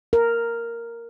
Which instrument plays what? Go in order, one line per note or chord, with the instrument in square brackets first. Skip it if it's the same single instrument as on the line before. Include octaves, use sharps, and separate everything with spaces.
[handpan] A#4